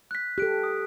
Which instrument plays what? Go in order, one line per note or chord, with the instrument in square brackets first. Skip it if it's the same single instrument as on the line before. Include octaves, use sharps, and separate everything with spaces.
[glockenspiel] F#6 B6
[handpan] G4 A4 [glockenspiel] F#6 D7
[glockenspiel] D#6